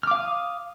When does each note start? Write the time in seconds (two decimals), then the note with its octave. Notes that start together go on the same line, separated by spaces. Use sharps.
0.03 F6
0.07 D6
0.11 F5
0.15 D#6